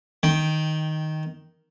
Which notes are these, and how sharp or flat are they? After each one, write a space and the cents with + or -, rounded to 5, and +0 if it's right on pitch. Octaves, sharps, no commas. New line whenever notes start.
D#3 +0 G5 +0